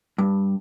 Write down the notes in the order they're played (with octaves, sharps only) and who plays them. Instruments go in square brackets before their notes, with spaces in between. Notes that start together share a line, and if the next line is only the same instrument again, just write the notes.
[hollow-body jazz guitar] G2